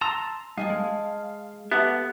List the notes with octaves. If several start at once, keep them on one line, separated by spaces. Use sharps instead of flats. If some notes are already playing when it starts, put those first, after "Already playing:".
A5 A#5 C6 E6
G2 D#5 F5 G#5 A5
G#3
B3 G4 A4 E5 F#5